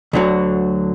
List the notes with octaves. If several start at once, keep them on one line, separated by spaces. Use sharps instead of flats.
D2 D3 F#3